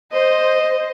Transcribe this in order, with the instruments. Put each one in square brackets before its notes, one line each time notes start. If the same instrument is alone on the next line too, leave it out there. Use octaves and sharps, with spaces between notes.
[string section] C5 [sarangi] D#5